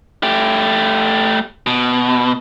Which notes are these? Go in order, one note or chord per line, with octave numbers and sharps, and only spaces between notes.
A3 G4
B2